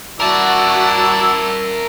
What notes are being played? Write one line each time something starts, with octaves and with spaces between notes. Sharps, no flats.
E4 F#4 A#4 D5 E5 A5